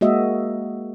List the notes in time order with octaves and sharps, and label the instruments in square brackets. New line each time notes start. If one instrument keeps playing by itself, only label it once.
[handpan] G#3 A#3 F#4 D#5 E5